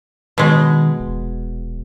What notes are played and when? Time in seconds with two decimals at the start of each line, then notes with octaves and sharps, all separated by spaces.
0.38 B2 D#3 G#3
1.00 D#1